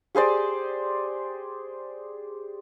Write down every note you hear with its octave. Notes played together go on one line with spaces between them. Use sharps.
G4 G#4 C5 D5